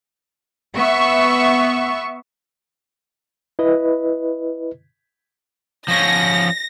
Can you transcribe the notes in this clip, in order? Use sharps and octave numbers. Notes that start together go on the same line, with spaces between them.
B3 E5 C#6
E4 B4 D#5
F3 C#4 A#6